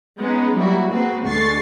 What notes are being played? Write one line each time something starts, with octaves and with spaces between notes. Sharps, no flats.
G#3 B3 C#4 D#4
F#3 G3 A#3 E4 F#4
G#3 A#3 C4 F#4 B4
D2 D3 G#3 C#6 A6 C7